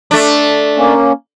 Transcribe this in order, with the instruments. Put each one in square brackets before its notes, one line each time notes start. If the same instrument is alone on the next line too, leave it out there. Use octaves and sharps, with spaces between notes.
[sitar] A3 D4
[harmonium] A#3 C#4